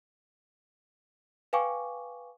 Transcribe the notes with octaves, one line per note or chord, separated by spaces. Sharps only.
B4 F5 G5 G#5 C#6 D6